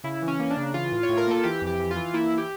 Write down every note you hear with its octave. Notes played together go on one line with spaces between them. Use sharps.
C#3 E4
E3
C#4
A#3
D4
C#3
E3 F4
A2
C#5
A2
A#4
A#3 A4
E3 G4
F2
G4
E3
F4
E3
A#3 E4
E3
G4